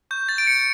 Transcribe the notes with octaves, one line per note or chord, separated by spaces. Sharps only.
C#6 G6
A6
G6 D7
C#7